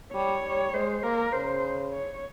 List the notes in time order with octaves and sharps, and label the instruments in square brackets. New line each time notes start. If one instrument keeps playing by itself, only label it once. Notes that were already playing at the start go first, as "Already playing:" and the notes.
[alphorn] G3 [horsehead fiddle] C#5
[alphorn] G3
[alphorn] G#3 [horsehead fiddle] C5
[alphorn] A#3 [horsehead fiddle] A#4
[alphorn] C#3 [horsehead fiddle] C5
[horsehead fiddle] C#5